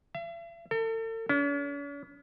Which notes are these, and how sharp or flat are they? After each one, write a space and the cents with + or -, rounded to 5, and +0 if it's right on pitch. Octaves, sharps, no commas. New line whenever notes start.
E5 +45
A4 +40
C#4 +45